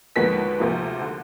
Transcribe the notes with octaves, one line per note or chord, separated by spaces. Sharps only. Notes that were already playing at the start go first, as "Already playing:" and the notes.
D#2 D3 F3 G#3 B3 B6
D2 C3 F3 A#3
D3